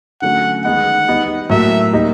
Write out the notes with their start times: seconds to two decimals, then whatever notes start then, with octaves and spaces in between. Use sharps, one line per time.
0.22 D3 F#3 A3 C#4 F#5
0.64 D#3 G#3 B3 D#4 F#5
1.08 G3 B3 D#4
1.50 A2 F#3 A#3 E5
1.93 G3 A#3 D#4